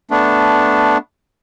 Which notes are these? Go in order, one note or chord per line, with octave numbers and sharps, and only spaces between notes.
A3 B3 D4